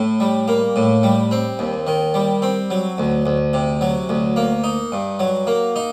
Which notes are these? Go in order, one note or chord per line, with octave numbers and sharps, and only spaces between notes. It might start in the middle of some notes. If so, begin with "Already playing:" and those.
Already playing: A2
G3
A#3
A2
G3
C4
D#2
D#3
G3
C4
F#3
D2
D2
C3
F#3
D2
A#3
D#4
G2
F#3
A#3
D#4